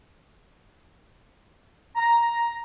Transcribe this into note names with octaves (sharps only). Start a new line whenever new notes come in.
A#5